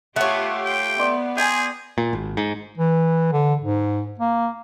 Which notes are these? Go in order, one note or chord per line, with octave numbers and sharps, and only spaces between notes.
A3 B3 F4 G4 C#5 F#5
G5
B3 D5 C6
G#4 G5 G#5 A#5
A#2
G#1
G#2
E3
D3
G#2
A#3